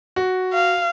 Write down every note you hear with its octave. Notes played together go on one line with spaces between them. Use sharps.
F#4
F5